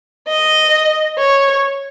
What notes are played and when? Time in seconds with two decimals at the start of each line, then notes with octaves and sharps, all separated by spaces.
0.28 D#5
1.19 C#5